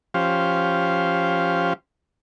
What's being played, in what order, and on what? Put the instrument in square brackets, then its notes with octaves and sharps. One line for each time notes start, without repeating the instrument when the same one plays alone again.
[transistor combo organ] F3 C#4 G4 C5 F5